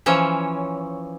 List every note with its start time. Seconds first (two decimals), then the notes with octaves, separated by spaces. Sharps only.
0.06 E3 F3 C#4 C#5